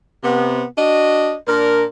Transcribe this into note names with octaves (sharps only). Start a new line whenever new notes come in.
C3 B3
D4 F#4 D#5
A#2 D4 A#4